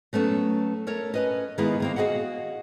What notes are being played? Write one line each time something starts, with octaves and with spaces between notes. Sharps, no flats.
F#3 A3 B3 C#4
A3 A#4 C#5
C#4 B4 D#5
D#3 G#3 A#3 B3 E4 G#4
D#3 A#3 C4
F#4 G#4 D#5 F5 F#5